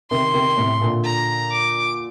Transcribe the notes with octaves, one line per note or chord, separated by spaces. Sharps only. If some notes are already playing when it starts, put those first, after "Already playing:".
C3 D#3 C6
C3 D#3
A2 C3
A#2 D3
A#5
D6